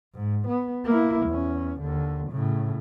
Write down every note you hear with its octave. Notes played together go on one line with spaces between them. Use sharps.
G#2
B3
A#3 E4
E2 C#4
D#2 D3
A2 C#3